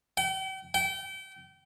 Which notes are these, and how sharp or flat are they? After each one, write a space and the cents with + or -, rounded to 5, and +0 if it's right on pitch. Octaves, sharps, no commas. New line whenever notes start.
G5 -40
G5 -30